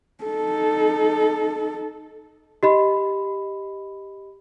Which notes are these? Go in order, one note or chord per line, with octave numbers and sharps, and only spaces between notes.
D#4 A4
G4 D#5 B5